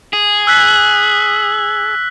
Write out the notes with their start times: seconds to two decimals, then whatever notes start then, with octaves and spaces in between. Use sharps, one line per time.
0.13 G#4
0.47 E6 F#6 B6